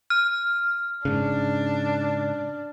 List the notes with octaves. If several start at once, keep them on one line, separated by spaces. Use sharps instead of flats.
F6
G#2 C#3 D4